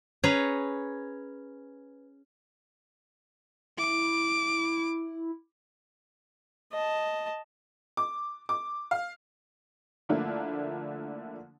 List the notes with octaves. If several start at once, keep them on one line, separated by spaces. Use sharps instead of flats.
C#4 G#4 B4 C#5 A#5
E4 D6
D#5 A5
D6
D6
F5
D3 F3 A3 A#3 D4 E4